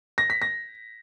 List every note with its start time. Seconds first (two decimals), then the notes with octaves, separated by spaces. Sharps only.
0.18 A#6
0.30 B6
0.42 A#6